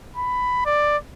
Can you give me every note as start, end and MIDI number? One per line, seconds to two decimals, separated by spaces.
0.17 0.64 83
0.66 0.97 74